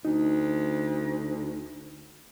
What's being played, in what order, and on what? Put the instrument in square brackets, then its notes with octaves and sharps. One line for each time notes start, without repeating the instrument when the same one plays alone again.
[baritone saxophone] D2 [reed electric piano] D#4